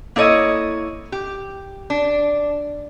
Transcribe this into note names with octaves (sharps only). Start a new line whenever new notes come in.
A#3 E4 A4 C#5 D#5
G4
D4